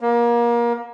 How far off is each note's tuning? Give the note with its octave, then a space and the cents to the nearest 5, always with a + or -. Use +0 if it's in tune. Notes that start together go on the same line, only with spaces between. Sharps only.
A#3 +25